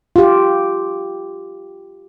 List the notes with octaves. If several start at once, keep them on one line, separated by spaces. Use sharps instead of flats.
F4 G4